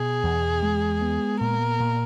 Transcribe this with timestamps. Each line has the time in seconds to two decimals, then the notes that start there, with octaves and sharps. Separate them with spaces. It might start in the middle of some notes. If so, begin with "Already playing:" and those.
Already playing: B2 G#4
0.23 E2
0.63 G#3
1.01 B3
1.41 A#2 A#4
1.80 A#2